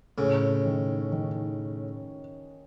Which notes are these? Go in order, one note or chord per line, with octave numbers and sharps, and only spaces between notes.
A2 C#3 C#4
D#3
D#3